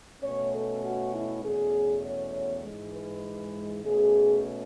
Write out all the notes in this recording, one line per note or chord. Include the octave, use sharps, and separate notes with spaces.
B2 A3 C#4 C#5
A4
F#4
E4
E2 B2 A3 C#4 G#4
C#5
G#2 E3 G#3
B4
B2 A3 C#4 G#4